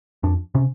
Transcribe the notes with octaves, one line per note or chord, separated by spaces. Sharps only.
F2 D4
C3 C#4